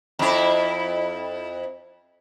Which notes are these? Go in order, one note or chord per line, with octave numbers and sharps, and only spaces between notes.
F2 E4